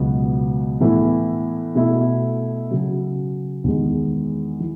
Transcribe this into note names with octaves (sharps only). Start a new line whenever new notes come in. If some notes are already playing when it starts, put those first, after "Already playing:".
Already playing: C#2 B2 F#3 B3 F#4
A2 E3 B3 E4
B2 A3 E4 A4
C#3 F#3 C#4
E2 D#3 G#3
E3